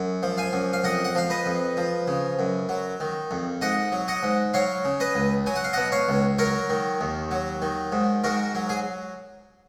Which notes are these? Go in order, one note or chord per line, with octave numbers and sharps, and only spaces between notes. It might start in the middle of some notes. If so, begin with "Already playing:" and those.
Already playing: F#2
F3
F5 G#5
F#2
F5
F2 D#5 F#5
F#5
F3 F5
B4 D#5
F2
F3
C#3
F#2
F#3
D#3
F2
G#2 D#5 F#5
F#3
D#5 F#5
G#2
F#3 C#5 F5
C#3
B4 D#5
C#2
F#3 G#5
F#5
F5
B2 D#5 F#5
C#5 F5
C#2
F#3 A#4 C#5
D#3
D#2
F#3
D#3
G#2
G#2 F#4 A#4
F#3
G#4